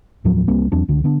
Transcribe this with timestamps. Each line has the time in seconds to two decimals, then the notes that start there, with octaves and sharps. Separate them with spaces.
0.25 D#2 A2 F3 F#3
0.48 C2 G3 A#3 C4
0.72 E2 F#3 C4 D4
0.88 C#2 D3
1.04 D3 B3 D4